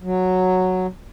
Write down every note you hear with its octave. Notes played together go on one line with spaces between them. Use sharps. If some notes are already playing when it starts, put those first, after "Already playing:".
F#3